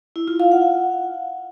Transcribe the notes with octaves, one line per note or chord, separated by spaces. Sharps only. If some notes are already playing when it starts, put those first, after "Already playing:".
E4
F4
F5
F#5